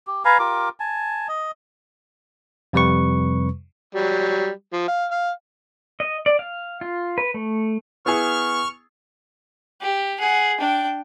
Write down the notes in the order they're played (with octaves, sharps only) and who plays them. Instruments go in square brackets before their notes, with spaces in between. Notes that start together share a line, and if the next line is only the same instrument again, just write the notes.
[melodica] G4
B4 F5 G#5 A#5
F4 G4 A#4 D6
G#5 A5
D#5
[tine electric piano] F2 C3 G3 B4 C#6
[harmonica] F#3 G3
F3
F5
F5
[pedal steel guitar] D#5
D5
F5
F4
B4
A3
[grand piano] B3 E4 G#4 [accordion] C#6 F6
[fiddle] G4
G#4 F#5
D4 G5